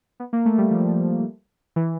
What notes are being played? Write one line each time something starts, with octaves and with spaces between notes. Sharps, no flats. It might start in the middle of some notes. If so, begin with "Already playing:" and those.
B3
A#3
A3
G3
F3
E3